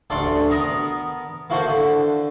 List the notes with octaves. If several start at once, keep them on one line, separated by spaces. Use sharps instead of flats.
A1 D2 D4 A4 D5 C6
B3 A#4 A#5 D#6
A#3 E4 F#4 A4 C5
D3